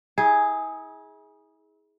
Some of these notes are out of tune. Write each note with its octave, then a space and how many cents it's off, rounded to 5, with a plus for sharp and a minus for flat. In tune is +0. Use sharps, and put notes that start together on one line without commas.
E4 -45 G#4 +0